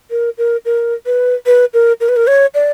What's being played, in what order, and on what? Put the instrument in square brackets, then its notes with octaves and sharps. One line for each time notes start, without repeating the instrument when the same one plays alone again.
[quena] A#4
A#4
A#4
B4
B4
A#4
A#4
B4
A#4
C#5
D5